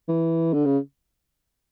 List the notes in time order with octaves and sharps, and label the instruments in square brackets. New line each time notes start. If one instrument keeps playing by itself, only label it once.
[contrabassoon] E3
D3
C#3